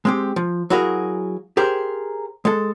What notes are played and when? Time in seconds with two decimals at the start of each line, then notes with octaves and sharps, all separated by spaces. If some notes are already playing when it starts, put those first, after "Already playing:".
0.05 G#3 C4 G4
0.36 F3
0.70 F#3 E4 F#4 G#4 A#4 F5
1.57 G4 G#4 A#4 C5
2.45 G#3 A4